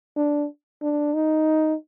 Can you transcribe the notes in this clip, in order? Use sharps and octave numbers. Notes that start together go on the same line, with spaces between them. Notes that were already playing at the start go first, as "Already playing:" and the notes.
D4
D4
D#4